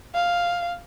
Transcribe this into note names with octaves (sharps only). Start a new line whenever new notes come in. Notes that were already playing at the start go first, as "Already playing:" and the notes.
F5